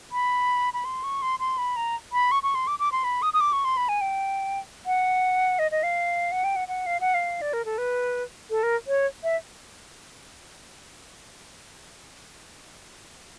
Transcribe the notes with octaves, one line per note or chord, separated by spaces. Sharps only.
B5
B5
C6
C#6
C6
C6
B5
A#5
B5
C#6
C#6
C6
D6
D6
C6
B5
D#6
D#6
D6
C#6
C6
B5
G#5
G5
F#5
D#5
D#5
F5
F#5
G5
F#5
F#5
F5
F#5
F5
D5
A#4
A4
B4
A4
A#4
C#5
E5